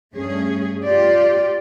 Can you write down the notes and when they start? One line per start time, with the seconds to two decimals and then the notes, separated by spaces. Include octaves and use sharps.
0.14 G2 A3 C#4 G#4
0.82 F4 G4 D5